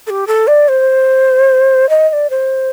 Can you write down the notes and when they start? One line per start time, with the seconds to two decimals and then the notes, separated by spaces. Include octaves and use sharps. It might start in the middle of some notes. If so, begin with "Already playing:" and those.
0.07 A4
0.10 G4
0.27 A4
0.47 D5
0.68 C5
1.89 D#5
2.09 D#5
2.13 D5
2.30 C5